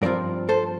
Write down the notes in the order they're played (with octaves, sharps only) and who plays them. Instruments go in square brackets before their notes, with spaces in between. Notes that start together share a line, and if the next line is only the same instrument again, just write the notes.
[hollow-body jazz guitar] G2 F3 C4 F4 A#4 D5
A4 C5